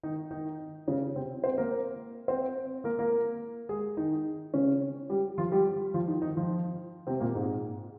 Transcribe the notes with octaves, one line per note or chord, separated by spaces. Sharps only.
D#3 D#4
D#3 D#4
C#3 C#4
C3 C4
C4 C5
A#3 A#4
C4 C5
A#3 A#4
A#3 A#4
G#3 G#4
D#3 D#4
C#3 C#4
G3 G4
F3 F4
G3 G4
F3 F4
D#3 D#4
D#3 D#4
F3 F4
C3 C4
A#2 A#3
G#2 G#3